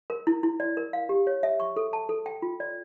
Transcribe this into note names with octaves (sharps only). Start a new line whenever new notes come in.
A#4
E4
E4
D5
A#4
F5
G4
C#5
E5
C#6
A4
A5
A4
G5
F4
D5